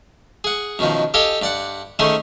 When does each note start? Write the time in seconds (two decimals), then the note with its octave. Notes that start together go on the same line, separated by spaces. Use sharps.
0.44 G#4 F#5
0.79 F#2 B2 D#3 F3
1.14 G4 A4 D#5 F5 G5 G#5
1.42 G2 D5 F#5
1.99 D#3 A3 C#4 G#4 C5